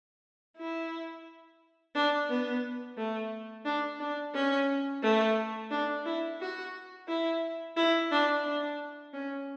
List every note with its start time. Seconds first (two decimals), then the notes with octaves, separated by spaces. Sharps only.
0.58 E4
1.95 D4
2.29 B3
2.98 A3
3.65 D4
4.00 D4
4.34 C#4
5.03 A3
5.71 D4
6.05 E4
6.40 F#4
7.08 E4
7.76 E4
8.11 D4
8.45 D4
9.13 C#4